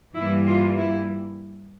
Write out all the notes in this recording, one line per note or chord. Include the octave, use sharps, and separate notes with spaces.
G2 E3 G3 A#3 E4
F4
E4